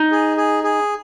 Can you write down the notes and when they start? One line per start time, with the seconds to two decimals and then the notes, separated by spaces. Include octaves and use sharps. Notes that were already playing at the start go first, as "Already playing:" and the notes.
Already playing: D#4
0.12 G#4
0.37 G#4
0.64 G#4